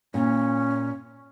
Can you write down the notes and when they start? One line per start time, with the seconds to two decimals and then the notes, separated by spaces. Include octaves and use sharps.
0.14 A#2 C#4